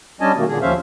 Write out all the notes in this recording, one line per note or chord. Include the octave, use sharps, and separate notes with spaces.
G3 C#4 D4 D#5 G#5 A5
B2 D#3 A3 A#3
A#2 D3 G#4
D#2 F3 C#4 C5 E5 F5